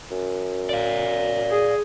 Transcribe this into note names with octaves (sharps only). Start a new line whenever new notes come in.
F#2
D5 F5
G#4